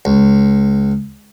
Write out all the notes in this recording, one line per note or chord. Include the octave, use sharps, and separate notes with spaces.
C#2